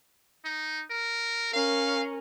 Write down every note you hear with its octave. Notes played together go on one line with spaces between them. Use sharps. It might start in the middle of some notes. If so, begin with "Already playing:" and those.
D#4
A#4
C#4 A#4 F5